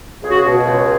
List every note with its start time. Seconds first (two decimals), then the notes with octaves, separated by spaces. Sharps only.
0.22 C#2 G#4
0.30 F#4
0.37 G#4
0.44 B2
0.66 C#2